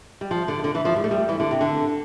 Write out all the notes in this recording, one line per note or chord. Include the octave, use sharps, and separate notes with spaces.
G3
F3
D3
D3
E3
F3
G3
A3
G3
E3
D3
C3
D3